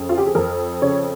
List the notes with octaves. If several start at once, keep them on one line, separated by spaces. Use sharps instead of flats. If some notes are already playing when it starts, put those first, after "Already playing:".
Already playing: F2 C#3
F4
G4
G#4
F2 A#4
C#3 C#5